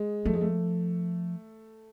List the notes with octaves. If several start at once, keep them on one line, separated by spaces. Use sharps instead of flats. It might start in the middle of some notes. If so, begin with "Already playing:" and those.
Already playing: G#3
F3 A3
G#3
A3